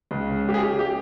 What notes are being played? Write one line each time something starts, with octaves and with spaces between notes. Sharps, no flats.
C#2
C#3
G#3 G4
G#4
G#3 G4
G4